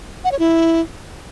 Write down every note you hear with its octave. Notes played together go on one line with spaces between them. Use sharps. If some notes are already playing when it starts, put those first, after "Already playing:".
F#5
C#5
E4